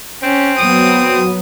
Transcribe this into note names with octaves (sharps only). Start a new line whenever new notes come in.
C4 C#4
F#3 B3 D#6